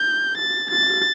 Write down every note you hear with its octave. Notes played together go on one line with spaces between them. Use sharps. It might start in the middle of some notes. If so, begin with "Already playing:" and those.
Already playing: G6
A6
A6